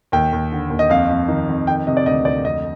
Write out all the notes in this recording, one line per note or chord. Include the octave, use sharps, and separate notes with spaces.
D#2 G5
D#2
D3
D#2
D#5
F2 F5
F2
D#3
F2
D#3 G5
C3 D#5
D5
D2 D#5
D2 D5
F2 D#5